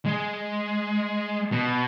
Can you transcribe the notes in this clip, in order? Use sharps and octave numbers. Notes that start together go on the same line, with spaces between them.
G#3
B2